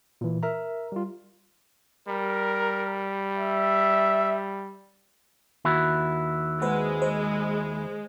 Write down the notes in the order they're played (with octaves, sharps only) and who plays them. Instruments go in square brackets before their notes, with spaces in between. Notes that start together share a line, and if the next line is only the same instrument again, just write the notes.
[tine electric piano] A#2 E3
A#4 E5 A#5
G3 F4
[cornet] G3 [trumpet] A#4
[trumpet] E5
[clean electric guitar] D#2 E4 F#4
[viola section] G#3 [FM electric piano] B4 C5 F#5
[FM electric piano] C5